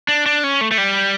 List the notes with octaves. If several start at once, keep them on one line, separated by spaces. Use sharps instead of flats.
D4
D4
C#4
A3
A3
G3